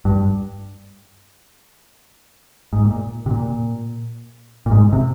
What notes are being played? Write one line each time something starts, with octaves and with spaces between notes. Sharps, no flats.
G2
G#2
A#2
C3
A#2
A#2
G#2
C3